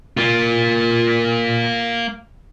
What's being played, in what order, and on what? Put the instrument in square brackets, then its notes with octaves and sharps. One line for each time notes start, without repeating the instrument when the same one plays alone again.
[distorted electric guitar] A#3 F4